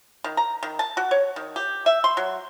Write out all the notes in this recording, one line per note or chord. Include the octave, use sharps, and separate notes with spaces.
D#3
A#5
D#3
A5
F#4
C#5
D#3
G4
E5
C6
F#3